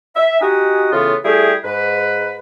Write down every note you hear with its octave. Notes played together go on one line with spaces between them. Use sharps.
E5
D#4 F#4 G4 D#5 F#5 G#5
A2 C#3 E3 B3 F4
G3 A3 E4 G4 G#4
G#2 B4